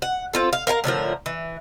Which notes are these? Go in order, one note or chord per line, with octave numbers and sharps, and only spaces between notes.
F#5
C4 F4 A4
F5
A#4 F5 G#5 A#5
A2 D3 F3 A#4
E3